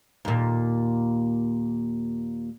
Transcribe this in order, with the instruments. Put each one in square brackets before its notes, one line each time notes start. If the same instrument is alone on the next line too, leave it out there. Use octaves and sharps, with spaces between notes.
[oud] D#2 A#2